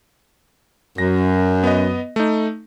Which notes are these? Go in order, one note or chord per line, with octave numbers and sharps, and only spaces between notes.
F#2 A#6
B3 D#5
A3 D#4